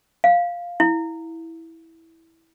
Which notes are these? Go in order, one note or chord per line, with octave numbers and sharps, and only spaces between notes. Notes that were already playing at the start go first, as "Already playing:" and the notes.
F5
E4